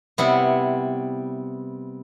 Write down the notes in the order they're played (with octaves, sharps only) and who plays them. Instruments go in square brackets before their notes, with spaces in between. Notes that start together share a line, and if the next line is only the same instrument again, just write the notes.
[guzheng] C3 G3 B3 E4